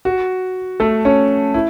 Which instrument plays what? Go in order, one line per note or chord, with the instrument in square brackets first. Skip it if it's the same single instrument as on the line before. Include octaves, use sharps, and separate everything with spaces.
[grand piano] F#4
A3 A4
C#4 C#5
E4